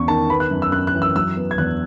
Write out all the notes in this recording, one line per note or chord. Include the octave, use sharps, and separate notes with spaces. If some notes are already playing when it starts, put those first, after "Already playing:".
Already playing: E2 C#4 C#6
D#3 A5
B3 B5
F#6
F#2
E6
F#2 F#6
F#6
E3
E6
F#3 E6
B3
G#6
E2 F#6